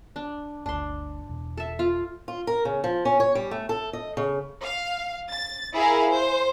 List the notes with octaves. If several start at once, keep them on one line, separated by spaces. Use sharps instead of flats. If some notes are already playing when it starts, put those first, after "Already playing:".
D4
G1 D2 D4 C6
E1
A4 E5
F4 F5
F4
A#4
C#3
F3
C#4
C#5
G3
A3
A4
D#5
C#3
F5
A6
E4 G#4 A#4 F5
C5